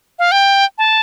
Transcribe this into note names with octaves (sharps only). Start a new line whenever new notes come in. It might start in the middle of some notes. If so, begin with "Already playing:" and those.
F5
G5
A5